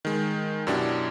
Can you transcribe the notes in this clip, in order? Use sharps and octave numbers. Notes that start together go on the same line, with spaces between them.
D#3 G#3
F#2 B2 D4 E4 G4